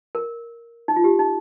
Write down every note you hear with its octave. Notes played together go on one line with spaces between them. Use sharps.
A#4
D#4
F4
G4
D#4